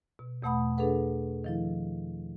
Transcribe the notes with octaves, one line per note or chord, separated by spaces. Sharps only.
B2
E2 B2 A3 F#5 B5 D#6
D4 G#4 A4 B4 F#5
D#3 F3 E4